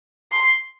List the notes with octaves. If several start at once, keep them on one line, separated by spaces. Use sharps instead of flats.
C6